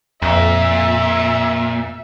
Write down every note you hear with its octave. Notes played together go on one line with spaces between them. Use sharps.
F2 A#2 E5